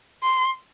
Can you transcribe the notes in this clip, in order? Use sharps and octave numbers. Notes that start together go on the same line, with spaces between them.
C6